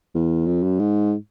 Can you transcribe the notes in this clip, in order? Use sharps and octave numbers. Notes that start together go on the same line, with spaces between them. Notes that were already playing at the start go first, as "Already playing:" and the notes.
E2
F2
F#2
G#2